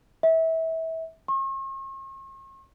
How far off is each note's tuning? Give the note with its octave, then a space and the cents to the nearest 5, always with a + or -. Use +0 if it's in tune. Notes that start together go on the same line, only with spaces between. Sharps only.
E5 -25
C#6 -45